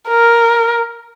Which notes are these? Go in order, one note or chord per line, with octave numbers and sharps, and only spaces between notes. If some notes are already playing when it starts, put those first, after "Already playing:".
A#4